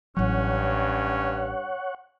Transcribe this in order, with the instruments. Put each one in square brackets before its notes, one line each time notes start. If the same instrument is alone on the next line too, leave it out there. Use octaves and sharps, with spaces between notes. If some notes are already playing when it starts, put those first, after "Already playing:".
[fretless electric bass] A1 F#3 [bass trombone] G2 [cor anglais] C#4 [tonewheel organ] C#5 F#5